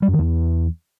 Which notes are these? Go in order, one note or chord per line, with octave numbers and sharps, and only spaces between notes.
G3
F#2
D#3
E2